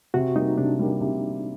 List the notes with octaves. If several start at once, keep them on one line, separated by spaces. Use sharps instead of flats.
C3 F#4
G3 A#3 D#4
C3 D4
G3 A#3
C3